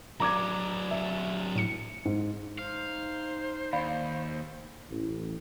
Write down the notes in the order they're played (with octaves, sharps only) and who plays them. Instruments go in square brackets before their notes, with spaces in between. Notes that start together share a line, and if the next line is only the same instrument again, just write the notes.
[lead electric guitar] F#3 D4 [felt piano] A#5 D6 G#6
[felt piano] E5
[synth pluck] A2 C#7
[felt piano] G#2
[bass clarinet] D#4 [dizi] C5 [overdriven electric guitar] F5
[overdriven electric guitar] D#2 [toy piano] D5 F5 B5
[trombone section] A1